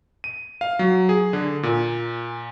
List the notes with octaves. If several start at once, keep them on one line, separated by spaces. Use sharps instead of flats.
D#7
F5
F#3
G#4
D3
A#2